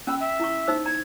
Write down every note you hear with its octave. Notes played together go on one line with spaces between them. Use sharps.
C#4 G5 B5 E6
E5
E4 A#5 C#6
D#4 C5 E6
A#5 G#6